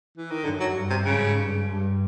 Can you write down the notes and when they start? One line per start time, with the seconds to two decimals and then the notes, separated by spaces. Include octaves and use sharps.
0.18 E3
0.31 D#3
0.44 F#2 D3
0.60 F#3
0.75 G2
0.90 C3
1.05 G#2 C#3
1.36 G2
1.66 G2